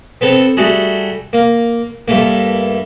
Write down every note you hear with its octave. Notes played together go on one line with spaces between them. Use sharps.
B3 C4 A4
G3 A3 F#4 G#4
A#3
G2 A3 A#3